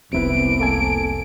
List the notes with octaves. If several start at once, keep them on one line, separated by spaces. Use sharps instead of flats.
F1 C2 C3 B3 C4 E4 B4 D7
A#3 A4 G#5